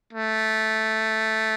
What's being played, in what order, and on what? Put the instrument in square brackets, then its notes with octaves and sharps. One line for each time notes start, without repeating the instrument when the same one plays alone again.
[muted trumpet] A3